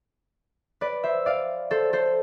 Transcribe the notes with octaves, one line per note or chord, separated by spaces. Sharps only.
B4 D5
C5 E5
D5 F5
A4 C5
A4 C5